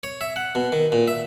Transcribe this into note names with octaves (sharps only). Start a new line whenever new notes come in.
C#5
E5
F#5
B2
D#3
A#2
E5